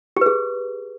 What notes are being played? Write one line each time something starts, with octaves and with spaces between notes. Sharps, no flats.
G4 G#4 B4